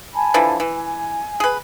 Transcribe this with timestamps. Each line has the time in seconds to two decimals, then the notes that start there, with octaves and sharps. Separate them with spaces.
0.13 G#5 A5 B5
0.34 D3 E3 F3
0.60 E3
0.73 G#5
1.40 G#4 B4